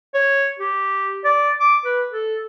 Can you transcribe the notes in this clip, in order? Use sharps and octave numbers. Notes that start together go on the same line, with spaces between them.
C#5
G4
D5
D6
B4
A4